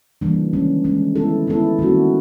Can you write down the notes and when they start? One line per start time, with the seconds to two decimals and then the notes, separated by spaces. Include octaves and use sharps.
0.21 C#3 E3 G3 A#3 D4
0.53 D#3 G#3 C#4
0.84 D#3 G#3 C#4
1.16 D#3 G#3 B3 E4 A4
1.47 D#3 G#3 B3 E4 A4
1.79 D#3 G3 A#3 C#4 F#4